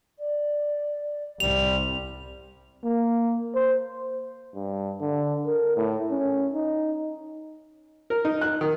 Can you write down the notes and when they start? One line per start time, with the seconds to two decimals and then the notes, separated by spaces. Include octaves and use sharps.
0.19 D5
1.40 C2 G3 C4 F7
2.84 A#3
3.55 C5
4.55 G2
5.01 D3
5.46 A#4
5.77 A2
6.11 C#4
6.54 D#4
8.10 A#4
8.25 D#4
8.41 F#6
8.61 D#3